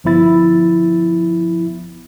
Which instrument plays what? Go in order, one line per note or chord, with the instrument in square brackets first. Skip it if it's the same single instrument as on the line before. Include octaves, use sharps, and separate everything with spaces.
[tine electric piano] G1 F3 B3 E4 A6